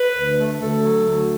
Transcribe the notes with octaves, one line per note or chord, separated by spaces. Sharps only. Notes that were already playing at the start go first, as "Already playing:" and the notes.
Already playing: B4
D2
A3
D2 A4
F#3
D2